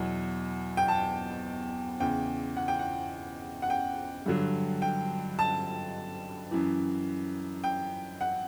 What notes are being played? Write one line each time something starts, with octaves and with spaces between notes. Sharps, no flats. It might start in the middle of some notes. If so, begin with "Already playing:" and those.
Already playing: E2 B2 F#3
G5
A5
E2 C#3 E3 G5
F#5
G5
F#5
F#5
G5
G2 D3 F#3
G5
A5
F#2 E3
G5
F#5